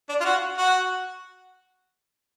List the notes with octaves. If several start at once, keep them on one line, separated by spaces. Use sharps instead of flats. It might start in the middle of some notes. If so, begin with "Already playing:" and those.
D4
F4
F#4
F#4